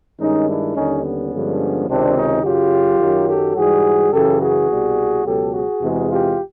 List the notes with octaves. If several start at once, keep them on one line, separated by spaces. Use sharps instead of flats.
G2 D#3 G#3 C#4 D#4
D4 E4
D#2 D3 G3 C#4 D#4
B3 C#4
G2 D3 F3 G#3
C#2 C3 D#3 C4 D4
C#4 D#4
F#2 C#3 F#3 F4 G4
F#2 D#3 F#3
G4 A4
G#2 E3 G3 F#4 G#4
F#2 C#3 E3 G4 A4
F#4 G#4
C2 B2 G3
C#2 B2 F#3 G4 A4
F#4 G#4
E2 C3 E3 G#3
F4 G4